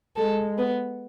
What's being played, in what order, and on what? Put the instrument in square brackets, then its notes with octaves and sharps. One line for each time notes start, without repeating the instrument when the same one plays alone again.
[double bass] G#3 [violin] A4
[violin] B3